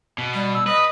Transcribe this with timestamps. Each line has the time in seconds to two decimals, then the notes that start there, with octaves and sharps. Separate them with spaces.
0.18 B2
0.34 G3
0.54 E6
0.67 B4 D#5 D#6